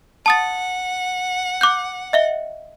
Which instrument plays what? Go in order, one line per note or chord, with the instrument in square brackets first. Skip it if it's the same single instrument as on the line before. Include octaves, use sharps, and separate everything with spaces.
[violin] F#5 [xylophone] A5 D#6 A6
[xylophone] D6 F#6 G6
D#5 E5 G7